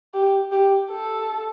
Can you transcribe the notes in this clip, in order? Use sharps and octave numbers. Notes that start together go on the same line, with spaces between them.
G4
G4
A4